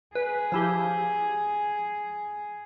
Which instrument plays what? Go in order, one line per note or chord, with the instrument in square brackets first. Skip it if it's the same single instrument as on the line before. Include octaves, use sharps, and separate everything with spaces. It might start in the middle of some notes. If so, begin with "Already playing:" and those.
[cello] G#4 [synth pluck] B4
[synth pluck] F3 E4 G4